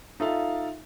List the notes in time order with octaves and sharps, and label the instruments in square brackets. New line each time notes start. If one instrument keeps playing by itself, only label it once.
[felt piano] D#4 F4 A4 E5 F5